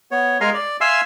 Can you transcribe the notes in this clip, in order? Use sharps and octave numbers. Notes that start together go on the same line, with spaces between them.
B3 C#5
G#3 A#4 F5 G#5 A#5 C6
D5
E5 F5 G#5 C6 E6